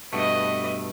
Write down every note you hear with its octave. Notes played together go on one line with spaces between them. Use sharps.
G2 B2 A3 B4 D#5